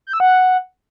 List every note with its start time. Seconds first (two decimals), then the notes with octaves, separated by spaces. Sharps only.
0.07 G6
0.13 E6
0.20 F#5